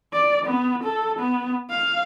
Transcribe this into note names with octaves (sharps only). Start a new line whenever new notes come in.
D5
B3
A4
B3
F5